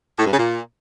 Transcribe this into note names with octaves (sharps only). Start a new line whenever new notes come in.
A2
G2
C#3
A#2